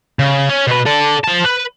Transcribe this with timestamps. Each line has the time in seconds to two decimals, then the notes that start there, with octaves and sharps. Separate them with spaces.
0.19 C#3
0.49 C#4
0.67 B2 B4
0.86 A4 D5
1.24 F3 A5
1.45 B4